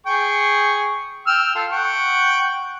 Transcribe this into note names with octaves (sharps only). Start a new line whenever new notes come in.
G#4 G5 C#6
G5 E6 F6
F4 A4
F#5 G5 C#6